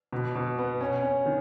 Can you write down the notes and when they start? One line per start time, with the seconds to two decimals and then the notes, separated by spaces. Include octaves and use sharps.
0.13 B2
0.35 B2
0.58 B3
0.80 C#4
1.03 C#4
1.26 D#3